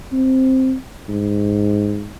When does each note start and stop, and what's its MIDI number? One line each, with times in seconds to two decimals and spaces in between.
0.12 0.74 60
1.09 2.10 44